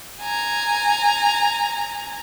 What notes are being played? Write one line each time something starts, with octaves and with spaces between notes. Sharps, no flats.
G#5 A#5